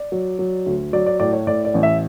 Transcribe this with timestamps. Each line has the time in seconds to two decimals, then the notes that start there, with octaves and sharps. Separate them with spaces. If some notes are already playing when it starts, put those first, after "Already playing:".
Already playing: D5
0.12 F#3
0.39 F#3
0.66 D2
0.93 F#3 D5
1.06 D5
1.20 A2 D5
1.33 C#5
1.47 A2 D5
1.65 D5
1.74 A1
1.83 E5